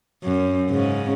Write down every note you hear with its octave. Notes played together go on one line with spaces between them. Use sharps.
F#2
G#2 C#3